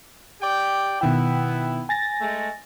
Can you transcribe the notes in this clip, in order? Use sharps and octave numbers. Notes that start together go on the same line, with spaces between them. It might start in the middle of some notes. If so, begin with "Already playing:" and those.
G4 D5 G5
B2 D#3 B3 E4 G5
G#5 A6 A#6
G#3 A3